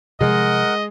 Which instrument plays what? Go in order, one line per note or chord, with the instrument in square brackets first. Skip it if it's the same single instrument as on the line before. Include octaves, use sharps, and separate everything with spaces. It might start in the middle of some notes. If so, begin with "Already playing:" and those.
[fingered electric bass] C3 F3 G3 [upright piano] G#3 [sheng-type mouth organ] A#4 F#5 [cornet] D#5